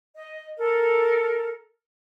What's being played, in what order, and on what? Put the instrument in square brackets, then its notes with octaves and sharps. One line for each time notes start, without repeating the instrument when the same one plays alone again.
[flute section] D#5
A4 A#4